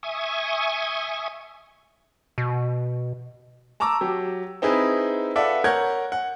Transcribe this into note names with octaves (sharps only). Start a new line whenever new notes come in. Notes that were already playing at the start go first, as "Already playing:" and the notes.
E5 G#5 C#6 D#6
B2
A5 A#5 C#6 D6 E6
F#3 G4
C4 D#4 E4 G#4 B4
F4 A4 B4 D5 E5 F#5
A#4 C#5 F#5 G6 G#6
F#5